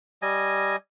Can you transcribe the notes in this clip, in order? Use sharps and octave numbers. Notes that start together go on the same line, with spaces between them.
G3 D#5 G#5